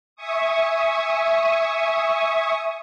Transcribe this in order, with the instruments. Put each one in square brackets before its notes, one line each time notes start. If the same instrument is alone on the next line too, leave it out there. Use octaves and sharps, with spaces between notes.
[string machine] E5 G#5 C#6 D#6